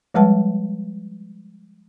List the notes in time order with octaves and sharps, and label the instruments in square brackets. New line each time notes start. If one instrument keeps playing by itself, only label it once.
[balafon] F3 G3 G#3 B4 F#5 A5